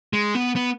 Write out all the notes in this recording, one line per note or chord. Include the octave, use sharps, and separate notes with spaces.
G#3
B3
B3